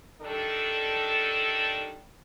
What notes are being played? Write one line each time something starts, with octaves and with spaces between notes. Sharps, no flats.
D#3 G3 D4 A4